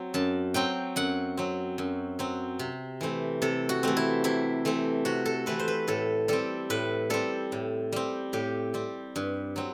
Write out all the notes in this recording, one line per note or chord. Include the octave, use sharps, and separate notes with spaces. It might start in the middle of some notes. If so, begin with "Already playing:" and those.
Already playing: F#3 C4
F#2 A5
F#3 C4 G5
F#2 F#5
F#3 C4
F#2
F#3 C4
C3
E3 A3 C4
C3 A4
F#4
E3 A3 C4
E4
C3 E4
E3 A3 C4
C3 F#4
A4
E3 A3 C4 B4
C5
B4
A2 A4
G3 C4 A4
A2 B4
G3 C4 A4
A2
G3 C4
A2 G4
G3 C4
G2
F#3 C4